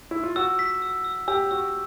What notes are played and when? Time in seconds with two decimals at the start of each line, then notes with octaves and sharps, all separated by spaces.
0.11 E4
0.23 F4
0.36 F#4 E6
0.59 B6
0.82 E6
1.05 E6
1.28 G4 E6
1.51 F#4 E6